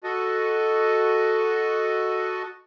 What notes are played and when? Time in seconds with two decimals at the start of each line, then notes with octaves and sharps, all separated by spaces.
0.04 F#4 A4 D#5